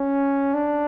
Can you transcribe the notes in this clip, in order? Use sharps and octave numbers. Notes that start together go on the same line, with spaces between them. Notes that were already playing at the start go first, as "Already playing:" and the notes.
Already playing: C#4
D4